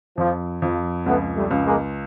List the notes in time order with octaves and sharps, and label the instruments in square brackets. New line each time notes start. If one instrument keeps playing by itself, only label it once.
[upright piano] F2 [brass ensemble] F3
[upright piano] F2 [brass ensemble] F3
[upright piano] C#2 [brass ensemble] A3 B3
[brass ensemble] G3 A3
[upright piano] C#2
[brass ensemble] G#3 A#3